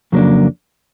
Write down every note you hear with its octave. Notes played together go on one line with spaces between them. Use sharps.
F2 C#3 F#3 A#3 D4